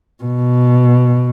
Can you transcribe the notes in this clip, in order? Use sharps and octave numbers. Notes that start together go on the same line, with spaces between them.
B2